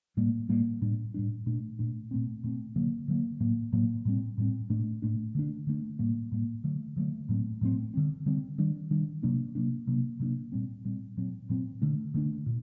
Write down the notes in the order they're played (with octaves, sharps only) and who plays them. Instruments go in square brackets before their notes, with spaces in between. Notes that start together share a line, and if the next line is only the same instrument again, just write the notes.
[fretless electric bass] A2 G3 A#3
A2 G3 A#3
A2 G3 D4
A2 G3 D4
A#2 A3 D4
A#2 A3 D4
A#2 A3 C4
A#2 A3 C4
D3 F#3 A#3
D3 F#3 A#3
A2 F#3 A#3
A2 F#3 A#3
A2 G3 C4
A2 G3 C4
A2 A3 D4
A2 A3 D4
D3 A3 D4
D3 A3 D4
A2 G3 A#3
A2 G3 A#3
D3 F#3 A3
D3 F#3 A3
A2 F#3 A3 C4
A2 F#3 A3 C4
D3 G3 C4
D3 G3 C4
D#3 G3 D4
D#3 G3 D4
C3 F#3 A#3 D4
C3 F#3 A#3 D4
C3 F#3 A#3 D4
C3 F#3 A#3 D4
A#2 G3 C4
A#2 G3 C4
A#2 F#3 C4
A#2 F#3 C4
D3 A3 D4
D3 A3 D4
A#2